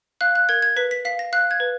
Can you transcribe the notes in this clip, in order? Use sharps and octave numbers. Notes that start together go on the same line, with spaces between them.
F5 F#6
F#6
A#4 G#6
G#6
B4 B6
B6
F5 B6
A#6
F5 F#6
G#6
B4